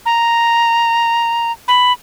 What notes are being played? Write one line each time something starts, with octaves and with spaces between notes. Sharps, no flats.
A#5
B5